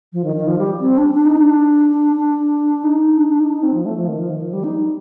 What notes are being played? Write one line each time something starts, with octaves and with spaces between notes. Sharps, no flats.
F3
D#3
D#3
F3
G3
C4
D4
D4
D#4
D4
D4
D#4
D4
D4
D#4
D#4
C4
F3
A3
F3
D#3
F3
D#3
F3
G3
D#4